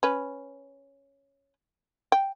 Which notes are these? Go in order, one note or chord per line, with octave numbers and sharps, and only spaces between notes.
C#4 B4
G5